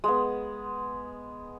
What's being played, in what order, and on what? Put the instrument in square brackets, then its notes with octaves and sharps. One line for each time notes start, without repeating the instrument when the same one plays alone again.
[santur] G#3 B3